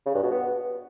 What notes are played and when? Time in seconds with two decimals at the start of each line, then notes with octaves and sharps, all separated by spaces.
0.06 C#3
0.14 G2
0.23 B2
0.31 B3